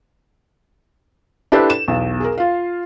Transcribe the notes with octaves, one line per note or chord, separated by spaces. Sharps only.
D4 E4 G4 A4 B4 C5
E7
B1 E2
G#4 A#4
F4 F5